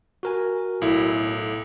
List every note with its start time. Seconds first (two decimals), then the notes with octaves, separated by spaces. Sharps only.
0.23 F#4 A#4 G#5
0.82 B1 A2 E4